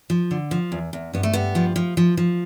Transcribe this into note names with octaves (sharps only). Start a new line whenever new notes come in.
F3
D3
F3
E2
E2
G2 B3
A3
G2 B3
F3
F3
F3
F3